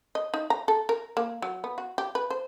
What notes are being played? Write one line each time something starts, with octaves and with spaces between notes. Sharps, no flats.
D#5
D#4
A#5
A4
A#4
A#3
F#3
B3
F#4
G4
B4
C5